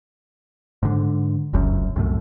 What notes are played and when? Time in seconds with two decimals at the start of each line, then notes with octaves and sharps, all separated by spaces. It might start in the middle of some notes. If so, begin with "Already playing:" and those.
0.83 G#2 D3
1.53 F1 C#2 F#2
1.96 C2 F#2 A2